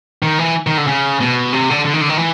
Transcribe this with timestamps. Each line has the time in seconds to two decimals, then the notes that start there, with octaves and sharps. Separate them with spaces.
0.23 D#3
0.39 E3
0.67 D#3
0.77 D3
0.87 C#3
1.20 B2
1.53 C3
1.70 D3
1.85 D3
1.94 D#3
2.01 D3
2.09 D#3
2.17 E3